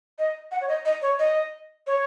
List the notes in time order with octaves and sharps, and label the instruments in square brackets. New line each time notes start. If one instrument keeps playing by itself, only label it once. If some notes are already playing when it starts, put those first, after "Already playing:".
[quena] D#5
F#5
C#5
D#5
D#5
C#5
D#5
C#5